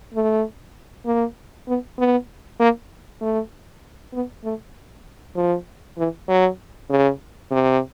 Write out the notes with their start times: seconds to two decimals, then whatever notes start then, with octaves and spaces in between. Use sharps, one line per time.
0.14 A3
1.06 A#3
1.67 B3
1.98 B3
2.60 A#3
3.21 A3
4.13 B3
4.44 A3
5.36 F3
5.98 E3
6.28 F#3
6.90 C#3
7.51 C3